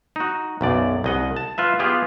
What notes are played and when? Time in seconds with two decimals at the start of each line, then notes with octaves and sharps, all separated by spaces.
0.16 D#4 F#4
0.61 B1 F#2 D5
1.04 C2 D#5 F#5
1.36 A5
1.58 F4 B4 E5
1.79 B3 F4 G4 G#4